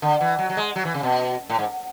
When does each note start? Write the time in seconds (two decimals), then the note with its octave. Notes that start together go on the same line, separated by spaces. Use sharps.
0.02 D3
0.21 E3
0.39 F#3
0.50 F#3
0.57 G#3
0.76 F#3
0.85 E3
0.94 C#3
1.03 B2
1.50 A2
1.59 G#2